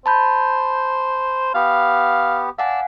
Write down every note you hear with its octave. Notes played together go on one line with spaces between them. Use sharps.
C5 A5 B5 G6
B3 G4 F5
D5 F5 F#5 G#5 A5 E6